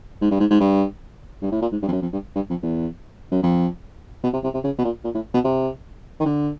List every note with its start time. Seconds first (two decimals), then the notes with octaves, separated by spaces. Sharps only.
0.21 G#2
0.31 G2
0.40 G#2
0.51 G#2
0.60 G2
1.42 G2
1.52 A2
1.62 A#2
1.72 G#2
1.82 G2
1.88 F2
1.92 F#2
2.02 F2
2.13 G2
2.35 G2
2.50 F2
2.63 E2
3.32 F#2
3.43 F2
4.23 B2
4.33 C3
4.43 C3
4.54 C3
4.64 C#3
4.79 B2
4.84 A#2
5.05 A#2
5.14 A2
5.34 B2
5.44 C3
6.20 D#3
6.26 D3